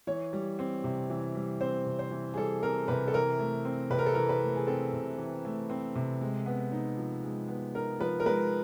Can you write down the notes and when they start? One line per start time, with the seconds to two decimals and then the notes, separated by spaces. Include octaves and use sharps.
0.07 E3 C#5
0.33 G3
0.59 C4
0.84 C3
1.10 E3
1.35 G3
1.61 C4 C5
1.86 C3
1.99 C5
2.11 E3
2.34 G#4
2.37 G3 A4
2.63 C4 A#4
2.88 C3 B4
3.08 A4
3.14 E3 A#4
3.39 A3
3.65 C4
3.90 C3 B4
3.98 A#4
4.06 A4
4.14 E3 A#4
4.29 B4
4.42 A3
4.56 G#4
4.67 C4 A4
4.93 C3
5.18 E3
5.45 A3
5.70 C4
5.95 C3
6.21 G#3
6.46 B3
6.72 D#4
6.97 F3
7.24 G#3
7.48 B3
7.74 D#4 A#4
8.00 F3 B4
8.20 A#4
8.26 G#3 B4